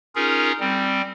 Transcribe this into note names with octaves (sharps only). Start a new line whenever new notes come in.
C#4 D#4 F4 G#4 A#4
G3 C4